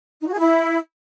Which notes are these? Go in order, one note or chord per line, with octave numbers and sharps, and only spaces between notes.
D#4
F#4
G#4
E4